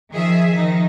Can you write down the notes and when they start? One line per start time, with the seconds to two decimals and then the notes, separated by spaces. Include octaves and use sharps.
0.11 D#3 F3 G#4 E5
0.55 D#3 F3 D#4